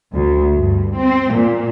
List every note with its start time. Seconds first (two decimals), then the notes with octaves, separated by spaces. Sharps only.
0.14 D2
0.57 G2
0.99 C4
1.34 A#2